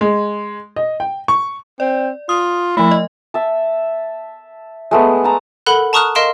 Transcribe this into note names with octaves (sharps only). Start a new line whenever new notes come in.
G#3
D#5
G5
C#6
C4 D5
F4 D#6
F3 A3 E4
D#5
E5 A5
G#3 A3 B3
A5 A#5
A4 A#4 F#5 B5 F#6
A5 A#5 C#6 D#6 F6 F#6
A#4 D#5 F5 C6 D7 E7